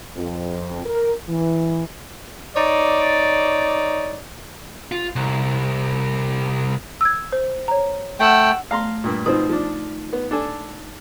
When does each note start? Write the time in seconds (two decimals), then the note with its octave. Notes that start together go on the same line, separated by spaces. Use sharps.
0.16 F2
0.86 A#4
1.29 E3
2.56 D#4 C#5 D5
4.92 F4
5.16 C2
7.01 E6 G#6
7.33 C5
7.68 C#5 A#5
8.20 A3 F#5 G5 E6
8.71 A3 F5 A#5 C6
9.04 G2 A#2
9.26 B2 F3 C4 D#4
9.49 F3 D4
10.13 B3
10.31 D4 A4 G#5